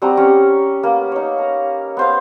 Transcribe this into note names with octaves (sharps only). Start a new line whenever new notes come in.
G3 C4 F#4 A#5
C#4 G4 C#5
A#3 B3
D#4 C#5
A#5
B3 C5 F5